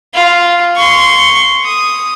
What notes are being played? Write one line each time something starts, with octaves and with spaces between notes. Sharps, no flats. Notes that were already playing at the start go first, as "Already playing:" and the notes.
F4
C6 C#6
D#6